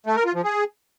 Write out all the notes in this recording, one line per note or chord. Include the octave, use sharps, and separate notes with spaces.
A3
A#4
F4
F3
G#4